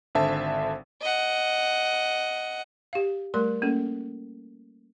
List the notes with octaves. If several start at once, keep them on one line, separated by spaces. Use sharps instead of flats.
G#1 D3 C5 E5 A5
D#5 F#5
G4 F5
G3 A3 A#4 C6
A#3 C#4 A4